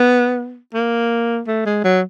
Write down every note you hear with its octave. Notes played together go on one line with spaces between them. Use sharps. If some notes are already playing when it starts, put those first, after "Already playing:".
Already playing: B3
A#3
A3
G#3
F#3